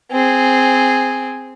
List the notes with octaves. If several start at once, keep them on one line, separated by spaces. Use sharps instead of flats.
C4 G#4